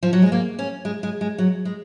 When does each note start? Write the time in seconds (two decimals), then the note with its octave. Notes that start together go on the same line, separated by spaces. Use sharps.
0.03 F3
0.13 F#3
0.22 G#3
0.32 A#3
0.59 C#4
0.85 G#3
1.03 G#3
1.21 G#3
1.38 F#3
1.65 G#3